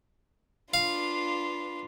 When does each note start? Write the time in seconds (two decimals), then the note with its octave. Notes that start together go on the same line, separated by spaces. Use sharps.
0.74 D4 F4 B4 F5